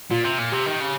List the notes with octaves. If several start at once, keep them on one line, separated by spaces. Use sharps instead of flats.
A#2 F4
C3
A#2
C3 G4
D#3
C#3